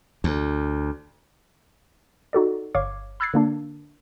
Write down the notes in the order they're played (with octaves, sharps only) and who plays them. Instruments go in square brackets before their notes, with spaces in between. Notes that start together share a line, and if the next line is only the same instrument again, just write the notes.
[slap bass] D2
[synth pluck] D#4 F#4 A4 D5
G1 C#5 F5 D6 G#6
B5 E6 F#6 G#6 A6 C7
D3 A#3 D4